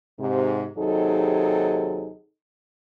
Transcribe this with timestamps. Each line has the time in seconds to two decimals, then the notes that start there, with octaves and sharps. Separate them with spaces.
0.19 G#2 C3
0.77 D#2 C3 F#3 D#4 G#4 A4